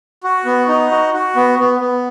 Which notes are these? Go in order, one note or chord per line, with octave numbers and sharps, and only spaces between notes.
F#4
B3
D#4
F#4
F#4
B3
B3
B3